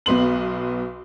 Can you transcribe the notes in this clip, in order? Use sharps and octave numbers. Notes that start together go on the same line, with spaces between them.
B1 B3 C6 F#7